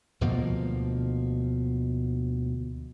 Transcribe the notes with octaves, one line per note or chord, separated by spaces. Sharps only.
D2 B2 F3 A#3